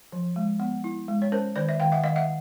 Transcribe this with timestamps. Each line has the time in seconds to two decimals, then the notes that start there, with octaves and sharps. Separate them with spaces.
0.12 F3
0.36 G#3
0.60 B3
0.84 E4
1.08 G#3
1.22 C#5
1.32 C#4 A#4 C5
1.56 D#3 C5 D5
1.69 D5 E5
1.80 D#3 F5 G5
1.92 E5 F#5
2.04 D#3 D#5 F5
2.16 E5 F#5